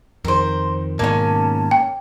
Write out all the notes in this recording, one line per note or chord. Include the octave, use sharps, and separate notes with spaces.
F2 D#3 A#4 C5
G#2 B2 D#3 A#3 C#4 A5
G5